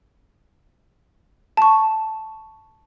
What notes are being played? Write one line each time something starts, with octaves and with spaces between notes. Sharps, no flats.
A5 C#6